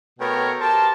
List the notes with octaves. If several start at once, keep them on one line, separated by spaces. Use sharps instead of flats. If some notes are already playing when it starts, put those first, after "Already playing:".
B2 A3 B3 A#4 C#5 G5
G4 A#4 C5 A5